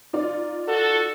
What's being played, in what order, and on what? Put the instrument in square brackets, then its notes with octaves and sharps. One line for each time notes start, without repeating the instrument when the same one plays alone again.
[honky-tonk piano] D#4 F4 D5
[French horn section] F#4 A4